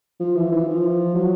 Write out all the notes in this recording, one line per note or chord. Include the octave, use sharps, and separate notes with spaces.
F3
E3
E3
F3
F#3